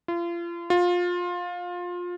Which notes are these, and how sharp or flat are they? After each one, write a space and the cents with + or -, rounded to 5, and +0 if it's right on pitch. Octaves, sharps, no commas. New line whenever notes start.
F4 -35
F4 +20